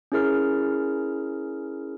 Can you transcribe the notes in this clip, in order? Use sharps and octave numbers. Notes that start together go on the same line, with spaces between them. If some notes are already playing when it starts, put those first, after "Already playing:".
C#4 E4 G#4 A#4 F6